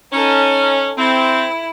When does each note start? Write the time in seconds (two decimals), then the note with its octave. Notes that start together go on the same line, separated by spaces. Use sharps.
0.12 C#4 D#4 A4
0.97 C4 E4